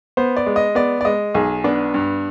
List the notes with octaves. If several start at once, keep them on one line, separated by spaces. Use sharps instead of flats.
B3 C5
D5
G#3
D#5
B3 D5
D5
G#3 D#5
B1 G#4
B3 D4
G2